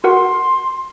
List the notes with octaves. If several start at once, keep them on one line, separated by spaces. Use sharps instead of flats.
F#4 A#4 F#5 C6